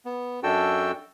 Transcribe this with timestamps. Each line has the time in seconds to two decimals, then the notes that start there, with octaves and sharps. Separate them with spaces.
0.05 B3
0.43 F#2 D4 F#4 A4 G5 E6